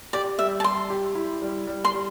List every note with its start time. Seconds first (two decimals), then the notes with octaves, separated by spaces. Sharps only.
0.13 G4 D5
0.38 G3 E5
0.60 A5
0.64 G3 C6
0.90 G4
1.15 E4
1.42 G3
1.67 G3
1.85 C6
1.93 G3